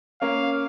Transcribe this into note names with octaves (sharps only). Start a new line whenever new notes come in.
A#3 C#4 F5